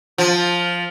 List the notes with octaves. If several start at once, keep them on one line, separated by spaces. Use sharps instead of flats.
F3